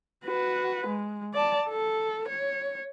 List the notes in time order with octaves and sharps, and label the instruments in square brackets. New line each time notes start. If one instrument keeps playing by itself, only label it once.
[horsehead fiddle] F#4 B4
G#3
D5 A5
A4
C#5